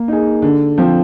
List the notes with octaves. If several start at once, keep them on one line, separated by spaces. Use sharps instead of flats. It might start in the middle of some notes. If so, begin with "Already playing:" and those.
Already playing: A#3
D#4 G#4
D3
F3 C4